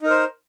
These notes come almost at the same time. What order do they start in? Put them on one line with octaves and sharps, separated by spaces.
D#4 A#4 C5